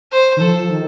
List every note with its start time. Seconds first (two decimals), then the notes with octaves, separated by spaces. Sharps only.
0.12 C5
0.37 D#3
0.40 F3 A4
0.70 D#3